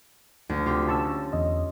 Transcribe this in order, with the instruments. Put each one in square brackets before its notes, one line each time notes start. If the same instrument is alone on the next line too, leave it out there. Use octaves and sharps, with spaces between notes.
[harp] D2
[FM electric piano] C3 [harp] F4 G4
[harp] C#4 [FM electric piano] A5 C#6 E6
[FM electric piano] E2 D#5